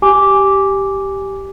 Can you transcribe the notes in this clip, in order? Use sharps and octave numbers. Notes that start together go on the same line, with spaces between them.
G4 G#5 D6